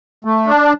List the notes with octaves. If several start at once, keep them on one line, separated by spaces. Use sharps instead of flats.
A3
D4